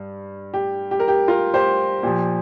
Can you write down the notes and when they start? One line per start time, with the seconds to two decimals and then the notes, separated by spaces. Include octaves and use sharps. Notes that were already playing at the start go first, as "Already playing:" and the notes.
Already playing: G2
0.54 G4
0.91 G4
1.00 A#4
1.08 G4
1.28 F4 A#4
1.54 G4 C5
2.03 A#2 F3 G4